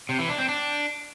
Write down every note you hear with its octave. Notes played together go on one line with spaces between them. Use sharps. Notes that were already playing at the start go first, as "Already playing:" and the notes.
C3
E3
D4
C4
D4